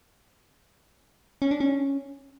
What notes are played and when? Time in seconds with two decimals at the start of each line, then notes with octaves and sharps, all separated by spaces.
1.42 C#4
1.51 D4
1.60 C#4